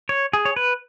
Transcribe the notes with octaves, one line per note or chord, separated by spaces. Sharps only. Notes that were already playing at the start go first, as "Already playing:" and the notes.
C#5
G#4
C#5
B4